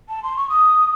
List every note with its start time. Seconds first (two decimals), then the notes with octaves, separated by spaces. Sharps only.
0.09 A5
0.23 C6
0.37 C#6
0.49 D#6